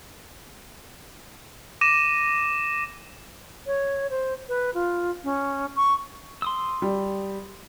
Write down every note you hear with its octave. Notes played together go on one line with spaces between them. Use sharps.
D6 A#6 D#7 E7
C#5
C5
B4
F4
C#4
C#6
C6 D#6 E6
G3